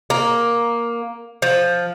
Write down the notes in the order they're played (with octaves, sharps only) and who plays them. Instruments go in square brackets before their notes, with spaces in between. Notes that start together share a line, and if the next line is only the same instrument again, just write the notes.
[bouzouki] A#3
F3